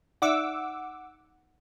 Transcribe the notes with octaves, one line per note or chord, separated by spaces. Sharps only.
D#4 D5 E5 F#5 D6 E6